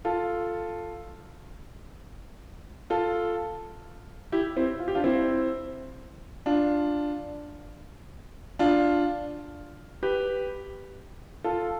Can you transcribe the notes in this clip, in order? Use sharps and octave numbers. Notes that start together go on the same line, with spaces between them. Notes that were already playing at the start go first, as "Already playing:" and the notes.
F4 A4
F4 A4
E4 G4
C4 E4
F4
G4
D4 F4
C4 E4
D4 F4
D4 F4
G4 B4
F4 A4